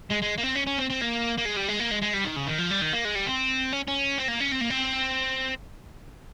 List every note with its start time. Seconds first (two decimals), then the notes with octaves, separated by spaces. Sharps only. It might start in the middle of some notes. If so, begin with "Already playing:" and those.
0.10 G#3
0.22 G#3
0.38 A#3
0.43 C4
0.56 C#4
0.67 C#4
0.78 C4
0.90 C4
1.01 A#3
1.37 A#3
1.45 G#3
1.56 G3
1.68 G#3
1.80 A#3
1.91 G#3
2.02 G#3
2.14 G3
2.25 D#3
2.36 C#3
2.47 D#3
2.58 F3
2.70 G3
2.81 D#3
2.93 A#3
3.05 G#3
3.15 G3
3.26 C4
3.73 C#4
3.88 C#4
4.18 C4
4.28 A#3
4.40 C#4
4.51 C4
4.61 A#3
4.70 C4